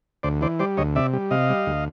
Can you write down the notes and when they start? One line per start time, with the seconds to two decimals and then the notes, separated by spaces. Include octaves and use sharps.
0.23 D2 C5 D5
0.41 E3 C5 D5
0.59 G3 C5 D5
0.77 D2 C#5 D#5
0.95 C3 D5 E5
1.13 G3
1.31 C3 D#5 F5
1.50 G3
1.66 D2